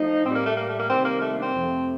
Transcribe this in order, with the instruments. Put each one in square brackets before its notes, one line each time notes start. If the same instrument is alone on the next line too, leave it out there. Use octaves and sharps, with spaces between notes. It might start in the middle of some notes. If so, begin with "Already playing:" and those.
Already playing: [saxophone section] F3 A3 D#4
A2 G3 C4
A#3
A3
A#3
A3
A#3
C3 D#3 G3 C4
A#3
A3
A#3
D4
C4
F2 C3 F3 A3